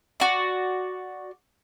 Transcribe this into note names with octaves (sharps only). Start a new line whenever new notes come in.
F#4 D5